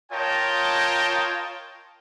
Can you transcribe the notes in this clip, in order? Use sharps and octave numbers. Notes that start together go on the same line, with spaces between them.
F4 A#4 C#5 D#5 G5 A5